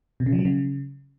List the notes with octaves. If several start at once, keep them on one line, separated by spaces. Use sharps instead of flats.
B2
C#3
F3
F#3
C#3